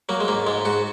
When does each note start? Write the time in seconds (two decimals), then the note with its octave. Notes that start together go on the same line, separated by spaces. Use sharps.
0.09 F#3 A#3
0.20 G#3
0.28 G#2 A#3
0.47 G#2 G#3
0.65 G#2 F#4